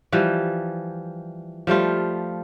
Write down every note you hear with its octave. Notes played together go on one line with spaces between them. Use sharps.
E3 F3 G3
F3 G3 A3 F4